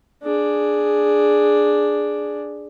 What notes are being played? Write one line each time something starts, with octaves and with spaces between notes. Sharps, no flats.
D4 G#4